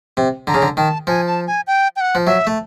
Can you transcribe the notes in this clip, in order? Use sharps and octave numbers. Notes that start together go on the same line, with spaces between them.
C3
D3 A#5
C#3
D3
D#3 A5
F3 G#5
A5
G#5
G5
G5
F#5
F3
F#3 E5
A3